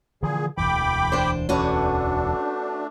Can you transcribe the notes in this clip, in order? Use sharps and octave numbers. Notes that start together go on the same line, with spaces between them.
A#2 D3 E3 F3 G#4
E1 D2 E3 G5 B5 D6
D4 C5
A3 C#4 D4 F#4 B4